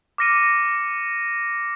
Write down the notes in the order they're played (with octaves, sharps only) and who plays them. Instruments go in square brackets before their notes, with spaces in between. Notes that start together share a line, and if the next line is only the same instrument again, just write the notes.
[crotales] D6 F6 A#6 C#7 D#7